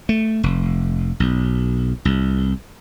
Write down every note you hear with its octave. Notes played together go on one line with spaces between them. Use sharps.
A3
F1
B1
C2